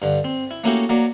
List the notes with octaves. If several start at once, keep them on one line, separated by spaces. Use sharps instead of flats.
G2 D3
C4
E4
A3 A#3 C#4 E4 F#4 G4
F#3 A#3 D5 D6